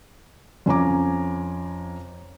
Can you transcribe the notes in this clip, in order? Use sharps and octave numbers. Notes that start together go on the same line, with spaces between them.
F2 C#4 F4 G#5 A#5 D6